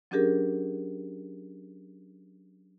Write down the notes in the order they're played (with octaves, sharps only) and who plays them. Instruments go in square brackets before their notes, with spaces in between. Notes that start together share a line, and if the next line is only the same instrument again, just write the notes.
[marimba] F#3 C#4 D4 G4 G#4 A#4